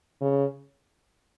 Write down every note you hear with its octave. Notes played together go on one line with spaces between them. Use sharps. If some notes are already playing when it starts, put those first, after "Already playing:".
C#3